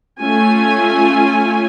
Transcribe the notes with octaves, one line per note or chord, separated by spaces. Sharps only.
A3 C#4 F4 G#5